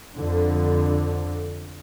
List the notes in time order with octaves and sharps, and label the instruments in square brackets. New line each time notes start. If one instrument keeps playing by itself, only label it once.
[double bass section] F2 D3